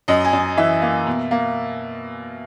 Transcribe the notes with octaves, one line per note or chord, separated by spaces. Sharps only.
F#2 D#5
G#5
F#2
E3 E5
A#3
B2
A#3